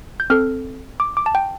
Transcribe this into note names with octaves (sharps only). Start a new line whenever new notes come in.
G6
C4 A4 F6
D6
D6
A5
G5